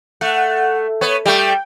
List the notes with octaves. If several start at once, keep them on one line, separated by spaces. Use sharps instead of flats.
A3 F#5
B3 C#5
G3 A3 G5